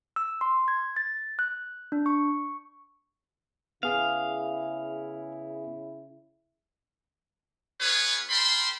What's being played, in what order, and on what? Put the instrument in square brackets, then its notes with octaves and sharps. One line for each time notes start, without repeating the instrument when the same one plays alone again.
[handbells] E6
C6
G#6
A6
F#6
D4
C#6
[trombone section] C#3 E4 [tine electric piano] B3 G#4 [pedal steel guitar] F5
[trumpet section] B3 F4 G#4 B4 C#5 G#5
A#4 G5 A5 B5 C6